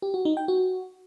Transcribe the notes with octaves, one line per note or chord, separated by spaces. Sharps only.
G4
F#4
D#4
G5
F#4